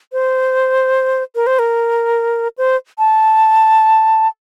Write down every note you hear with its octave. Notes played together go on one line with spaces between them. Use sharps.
C5
A#4
C5
A#4
C5
A5